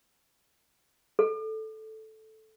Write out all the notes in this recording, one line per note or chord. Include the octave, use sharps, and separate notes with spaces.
A4